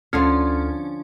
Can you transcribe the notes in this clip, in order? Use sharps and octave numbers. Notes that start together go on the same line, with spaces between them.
D2 D3 F3 C#4 F4 A4 F6